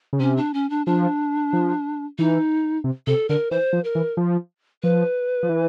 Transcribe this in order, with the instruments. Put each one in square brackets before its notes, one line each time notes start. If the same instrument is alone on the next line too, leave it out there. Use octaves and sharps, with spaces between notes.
[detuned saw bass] C#3
[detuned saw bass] C3 [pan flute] C#4
[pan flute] D4
C#4
D4
[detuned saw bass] F3 [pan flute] D4
[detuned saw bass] F3
[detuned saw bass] E3 [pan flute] D#4
[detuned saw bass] C3
[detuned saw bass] C3 [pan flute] A4
[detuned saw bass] D3 [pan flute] A#4
[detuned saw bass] E3 [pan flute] C5
[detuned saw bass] F3
[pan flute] A#4
[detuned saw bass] E3
F3
[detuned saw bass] F3 [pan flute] B4
[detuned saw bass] F3
E3